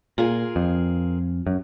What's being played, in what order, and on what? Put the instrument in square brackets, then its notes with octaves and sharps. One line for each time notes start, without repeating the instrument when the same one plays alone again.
[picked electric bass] A#2 [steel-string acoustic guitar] F4 G#4 A#4
[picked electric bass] F2
F#2